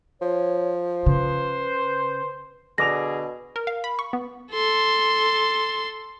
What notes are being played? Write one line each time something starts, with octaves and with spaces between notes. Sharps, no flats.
F3 C#5
C#3 B4 C5
B2 D3 G#4 D6 A#6 F7
A#4
F5
B5
C#6
B3
A4 C6